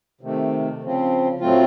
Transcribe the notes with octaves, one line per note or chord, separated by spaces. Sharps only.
C3 D#3 A3
C#3 F3 C4
A2 F#3 A3 C4 F4